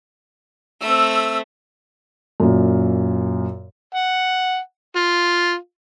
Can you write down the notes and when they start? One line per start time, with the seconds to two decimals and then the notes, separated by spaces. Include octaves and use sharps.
0.81 A3 C4 E6
2.40 F#2 A#2
3.95 F#5
4.96 F4